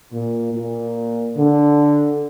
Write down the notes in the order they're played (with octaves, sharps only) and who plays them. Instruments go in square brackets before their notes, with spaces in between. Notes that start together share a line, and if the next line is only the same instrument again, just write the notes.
[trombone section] A#2
A#2
D3